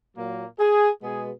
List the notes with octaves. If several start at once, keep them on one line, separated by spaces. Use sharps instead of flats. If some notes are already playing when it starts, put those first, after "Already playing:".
A#2 F#3 A#3
G#4
B2 G#3 B3 G#4